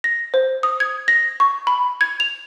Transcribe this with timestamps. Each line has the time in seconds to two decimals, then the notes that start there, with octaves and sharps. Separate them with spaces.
0.04 A#6
0.34 C5
0.63 D#6
0.80 G#6
1.08 A#6
1.40 C#6
1.67 B5
2.01 G#6
2.20 F7